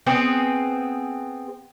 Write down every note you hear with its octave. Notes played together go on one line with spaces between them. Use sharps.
B3 C4 G#4 C5